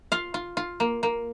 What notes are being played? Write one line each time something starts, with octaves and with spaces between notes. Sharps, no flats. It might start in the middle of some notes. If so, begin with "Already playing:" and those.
F4 F5
F4
F4
A#3
A#3